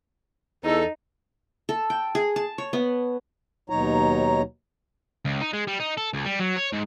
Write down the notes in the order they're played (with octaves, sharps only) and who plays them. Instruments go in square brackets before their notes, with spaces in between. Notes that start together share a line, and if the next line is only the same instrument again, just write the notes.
[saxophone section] E2 A4 [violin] D#4
[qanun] A4
G5
G#4
A5
C#5
B3
[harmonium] D#2 B2 F#3 D#4 C#5 A#5
[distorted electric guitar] C#2
D#4
G#3
G3
D#4
A4
C#2
G3
F#3
C#5
G#2